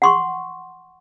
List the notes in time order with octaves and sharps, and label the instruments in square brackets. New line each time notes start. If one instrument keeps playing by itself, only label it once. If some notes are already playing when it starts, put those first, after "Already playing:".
[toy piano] F#5 C6 C#6